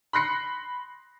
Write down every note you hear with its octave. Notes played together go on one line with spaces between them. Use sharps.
B5 C6 F#6 A#6 C7 C#7